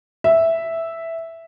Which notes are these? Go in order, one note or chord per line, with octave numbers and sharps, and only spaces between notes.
E5